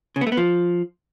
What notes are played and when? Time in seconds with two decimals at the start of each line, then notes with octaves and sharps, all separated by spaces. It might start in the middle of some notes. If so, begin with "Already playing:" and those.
0.16 C#3
0.21 B3
0.27 A3
0.32 B3
0.37 F3